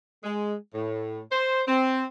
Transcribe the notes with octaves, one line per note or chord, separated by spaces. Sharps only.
G#3
A2
C5
C4